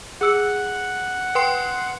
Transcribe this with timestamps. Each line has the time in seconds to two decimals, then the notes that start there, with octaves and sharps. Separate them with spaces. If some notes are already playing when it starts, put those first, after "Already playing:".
0.21 G#4 F#5 E6 C#7
1.35 B4 G5 C6 C7